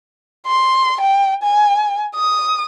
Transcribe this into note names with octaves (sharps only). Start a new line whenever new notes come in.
C6
G5
G#5
D#6